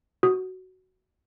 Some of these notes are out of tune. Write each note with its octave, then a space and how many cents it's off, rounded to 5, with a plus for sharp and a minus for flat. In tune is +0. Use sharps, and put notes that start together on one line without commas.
F#4 +10 D#6 +0